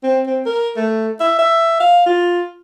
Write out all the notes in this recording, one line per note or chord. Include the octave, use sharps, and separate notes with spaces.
C4
C4
A#4
A3
E5
E5
F5
F4